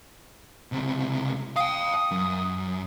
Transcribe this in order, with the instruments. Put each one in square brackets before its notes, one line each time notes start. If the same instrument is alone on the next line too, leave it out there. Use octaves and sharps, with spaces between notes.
[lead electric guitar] C#2 C3
[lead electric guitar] F5 G5 [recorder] D#6
[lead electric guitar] F#2